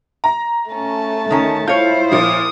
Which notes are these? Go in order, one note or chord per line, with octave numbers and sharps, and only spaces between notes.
A#5
A3 C#4 A5
D2 D#3 C#4
E4 F4 C5 C#5 G6
A#2 F3 D#6